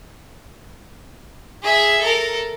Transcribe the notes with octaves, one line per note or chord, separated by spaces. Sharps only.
G#4 E5
A4 A#4